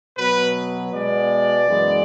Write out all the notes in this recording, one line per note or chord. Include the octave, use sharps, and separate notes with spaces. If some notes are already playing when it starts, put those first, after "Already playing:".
B2 F#3 B3 B4
B2 G#3 B3 D5
F#2 E3 G#3 B3